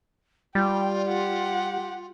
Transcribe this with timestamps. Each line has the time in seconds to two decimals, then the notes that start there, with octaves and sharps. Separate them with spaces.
0.55 G3 F4 G5
1.06 G4 F#5